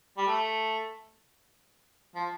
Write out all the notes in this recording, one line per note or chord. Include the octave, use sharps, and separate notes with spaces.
G3
A3
F3